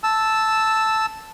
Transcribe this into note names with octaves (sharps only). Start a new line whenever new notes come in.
A5 E6